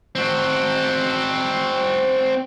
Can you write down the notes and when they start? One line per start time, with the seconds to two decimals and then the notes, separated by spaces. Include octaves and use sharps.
0.15 C4 F#4